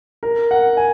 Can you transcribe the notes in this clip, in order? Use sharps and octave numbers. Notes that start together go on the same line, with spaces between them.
A#4
F#5
G#5